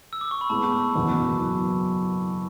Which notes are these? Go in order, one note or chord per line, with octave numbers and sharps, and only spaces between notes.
E6
D6
C#6
B5
A2 G#3 B3 A5
F#1 E2 B2 F#3